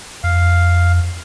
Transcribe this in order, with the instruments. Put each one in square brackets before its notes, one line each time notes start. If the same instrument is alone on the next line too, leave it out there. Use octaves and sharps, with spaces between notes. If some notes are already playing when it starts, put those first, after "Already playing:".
[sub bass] F2 [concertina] F5